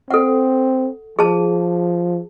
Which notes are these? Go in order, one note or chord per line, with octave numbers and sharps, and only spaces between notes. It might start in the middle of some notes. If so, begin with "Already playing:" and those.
C4 A4 F#5
F3 G#4 A5